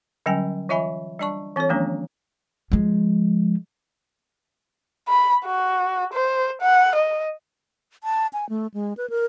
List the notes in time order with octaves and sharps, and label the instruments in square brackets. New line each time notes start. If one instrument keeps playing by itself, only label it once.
[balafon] D3 F#3 G3 C#4 G5 G#5
E3 F4 D#5 E5 G#5 B5
G3 D4 D5 A5 C#6
E3 C4 F4 A4 C#5
D#3 F3 G#3 A#3 C#4 D4
[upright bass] F3 G#3
[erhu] B5
F#4
C5
F#5
D#5
[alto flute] A5
G#5
A3
G#3
B4
A#4